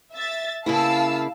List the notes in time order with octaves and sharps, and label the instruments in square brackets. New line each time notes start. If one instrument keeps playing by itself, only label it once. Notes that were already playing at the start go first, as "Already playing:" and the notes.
[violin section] E5 A6
[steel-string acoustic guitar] C#3 A#3 E4 [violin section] F5 A5 E6